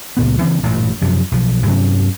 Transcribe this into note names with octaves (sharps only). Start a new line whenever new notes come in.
C#2 A#2 B3
C#3 E3 F3 C4
A1 G2 A#2
F#2 C3 F3
B1 F3
G2 C3 F#3 C#4